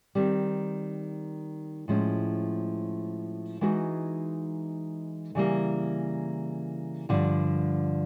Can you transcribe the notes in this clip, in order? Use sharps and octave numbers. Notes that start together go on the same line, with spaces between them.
D#3 G3 C4
A2 F3 G#3 C#4
E3 G#3 B3 D#4 F#4
C#3 E3 G3 A#3
G2 D3 F3